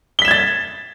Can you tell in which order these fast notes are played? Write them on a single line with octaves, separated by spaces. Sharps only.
G7 B6 E7 G#6 A6